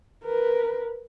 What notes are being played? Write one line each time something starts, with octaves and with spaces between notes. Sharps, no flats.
A#4 B4